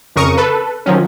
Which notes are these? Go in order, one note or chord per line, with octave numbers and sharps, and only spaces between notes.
F2 C#3 A#4 C#6 D#6
A4 B4
D#3 F3 F#3 C#4